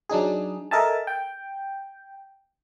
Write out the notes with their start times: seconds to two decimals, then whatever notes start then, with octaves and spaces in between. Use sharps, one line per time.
0.09 F#3 D4 D#4 G#4
0.71 A4 A#4 D#5 E5 G#5 A5
1.07 G5